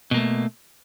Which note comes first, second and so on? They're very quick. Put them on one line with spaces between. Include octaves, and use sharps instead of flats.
B2 A#3 A3